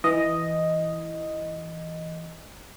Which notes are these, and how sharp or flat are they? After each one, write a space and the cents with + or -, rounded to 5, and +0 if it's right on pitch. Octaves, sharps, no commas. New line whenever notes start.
E3 +0 D#5 +0